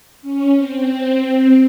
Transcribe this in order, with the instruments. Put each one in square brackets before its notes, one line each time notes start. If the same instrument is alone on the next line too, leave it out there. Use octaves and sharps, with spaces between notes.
[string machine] C#4
C4